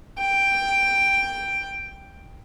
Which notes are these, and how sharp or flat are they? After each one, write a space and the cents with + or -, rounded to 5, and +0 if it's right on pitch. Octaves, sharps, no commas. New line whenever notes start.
G5 +5